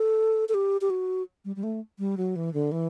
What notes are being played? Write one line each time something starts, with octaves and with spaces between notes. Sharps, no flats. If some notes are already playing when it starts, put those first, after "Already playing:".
Already playing: A4
A4
G4
G4
F#4
G3
G3
A3
G3
F#3
E3
D3
E3